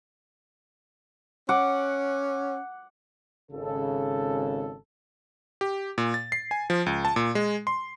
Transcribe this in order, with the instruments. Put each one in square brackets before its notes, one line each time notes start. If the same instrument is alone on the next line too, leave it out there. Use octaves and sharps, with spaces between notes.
[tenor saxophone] C#4 [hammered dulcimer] F#5 D6
[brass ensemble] G#1 C#3 A4
[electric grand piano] G4
A#2
A6
C7
G#5
F3
C#2
A5
A#2
G#3
C6